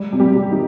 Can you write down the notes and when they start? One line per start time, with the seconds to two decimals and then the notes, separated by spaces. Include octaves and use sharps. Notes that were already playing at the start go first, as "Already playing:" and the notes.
Already playing: G3 G#3
0.12 C3
0.20 G3 G4
0.36 C3
0.51 D#3 D#4